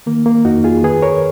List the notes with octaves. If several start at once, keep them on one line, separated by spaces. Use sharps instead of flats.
D#3 A#3
A#3
F2 D#4 F#4
F4 G#4
D#3 G#4 B4
A#4 C#5